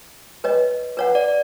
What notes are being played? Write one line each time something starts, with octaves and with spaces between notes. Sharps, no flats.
B4 C#5 D#5
B4 C#5 F#5
D5